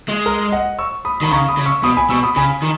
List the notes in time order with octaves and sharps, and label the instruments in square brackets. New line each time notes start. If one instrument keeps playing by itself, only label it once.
[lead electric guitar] G#3
[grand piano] A#4
D#5 F#5
C#6 E6
B5 D#6
[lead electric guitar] D#3 [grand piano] B5
[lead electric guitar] C#3 [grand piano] A#5 C#6
[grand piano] B5 D#6
[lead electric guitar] C#3
[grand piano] C#6 E6
[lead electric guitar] B2 [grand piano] B5 D#6
[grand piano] G#5 B5
[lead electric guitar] B2 [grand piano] C#6 E6
[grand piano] B5 D#6
[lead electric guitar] C#3 [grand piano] G#5 B5
[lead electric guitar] D#3